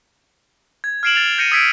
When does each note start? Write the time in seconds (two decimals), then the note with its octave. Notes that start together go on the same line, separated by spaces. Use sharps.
0.84 G#6
1.03 F6 G#6 C7 D7 E7 F#7
1.15 A6 F7
1.38 G6 A#6 C#7 D#7
1.52 D#6 E6 G#6 B6 C7 D7